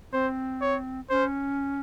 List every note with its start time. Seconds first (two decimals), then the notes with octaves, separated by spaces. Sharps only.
0.12 C4 C5
0.61 C#5
1.10 C#4 C5